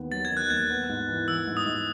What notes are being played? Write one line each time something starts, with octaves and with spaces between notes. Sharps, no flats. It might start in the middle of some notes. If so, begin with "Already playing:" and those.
Already playing: D#2 D#3 B3
F#3 A6
G#6
D#3
F#6
D#2 G#6
B3
G#2
E3
E3 E6
G#2
D#6
G#2